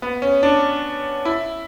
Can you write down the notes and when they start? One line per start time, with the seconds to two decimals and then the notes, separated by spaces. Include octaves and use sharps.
0.02 B3
0.22 C#4
0.43 D4
1.25 E4